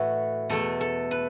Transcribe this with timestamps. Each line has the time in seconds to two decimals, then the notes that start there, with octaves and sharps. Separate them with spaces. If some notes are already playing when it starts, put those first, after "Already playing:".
Already playing: A2 E3 A3 E4 F#4
0.50 E2 B2 A3 A4
0.81 A4
1.11 B4